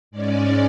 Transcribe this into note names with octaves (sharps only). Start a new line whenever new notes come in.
G#2 G#3 C#4 D5